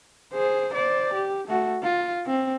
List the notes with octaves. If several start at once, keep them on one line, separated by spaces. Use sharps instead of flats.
G#4 C5
C5 D5
G4
A3 F#4
F4
C4